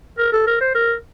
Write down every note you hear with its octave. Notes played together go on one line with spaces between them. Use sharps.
A#4
A4
A#4
C5
A#4